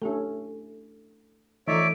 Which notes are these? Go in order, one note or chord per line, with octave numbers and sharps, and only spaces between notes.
A3 C#4 D4 G4 A4
E3 F3 A3 D#4 C#5 D5 E5 D7